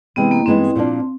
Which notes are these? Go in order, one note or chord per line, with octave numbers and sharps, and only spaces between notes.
C3 E3 G#3 B3 C4
A#3
G2 E3 G#3 B3 C4 D#4
A#2 F3 A#3 D4